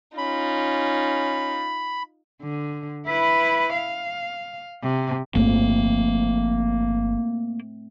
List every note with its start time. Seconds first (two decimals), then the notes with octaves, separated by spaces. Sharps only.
0.18 C#4 D#4 F4 B5
2.42 D3
3.07 E4 B4
3.74 F5
4.83 C3
5.35 G1 F3 A3 A#3 C4